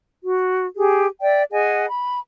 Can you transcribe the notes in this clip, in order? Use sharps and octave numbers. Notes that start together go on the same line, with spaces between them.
F#4
G4 G#4
D5 E5 G5
G#4 D#5 F#5 G#5
B5